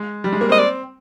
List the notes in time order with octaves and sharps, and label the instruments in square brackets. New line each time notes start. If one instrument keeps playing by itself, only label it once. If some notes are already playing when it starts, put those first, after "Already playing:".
Already playing: [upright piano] G#3
G3
G#3
A#3
[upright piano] C4 [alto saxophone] D#5
[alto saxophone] D5